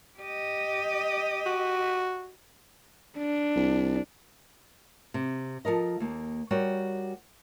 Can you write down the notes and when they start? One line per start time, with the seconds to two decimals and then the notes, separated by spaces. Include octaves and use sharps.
0.19 G4 D#5
1.46 F#4
3.18 D4
3.56 C2
5.14 C3
5.65 F3 A4 A#4 D#5
6.00 D#2 A#3
6.51 G3 F#4 A#4 C#5 G5